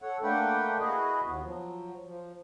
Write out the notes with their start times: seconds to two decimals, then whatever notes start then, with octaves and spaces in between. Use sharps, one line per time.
0.02 A4 C#5 F#5
0.23 A3 A#3 D4 B4 F#5 G5
0.80 E4 F#4 G#4 B4 D#5
1.25 D#2 B3
1.43 F3 F#3
2.07 F3